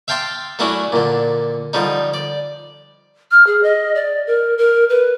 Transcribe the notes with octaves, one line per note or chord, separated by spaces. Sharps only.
E5 F5 G5 A5 C6 D6
F#3 A3 C#4 D4 E4
A#2 D3
D3 F3 G3 D#4
D5
F6
G#4
D#5
D5
A#4
A#4
B4